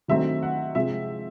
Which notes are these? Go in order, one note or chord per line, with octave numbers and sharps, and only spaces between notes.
D#3 F#3 A3 C4 E5
F#5
C3 F3 G#3 C4 E5